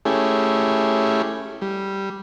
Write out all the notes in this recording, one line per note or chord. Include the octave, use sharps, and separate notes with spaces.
A3 C#4 E4 G4 G#4
G3